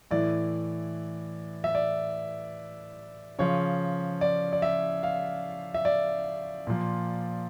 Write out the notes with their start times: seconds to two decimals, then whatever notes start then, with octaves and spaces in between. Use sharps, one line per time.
0.11 A2 E3 D5
1.64 E5
1.75 D5
3.39 C#3 F3 C#5
4.21 D5
4.53 D5
4.62 E5
5.03 F5
5.74 E5
5.85 D5
6.67 A#2 F3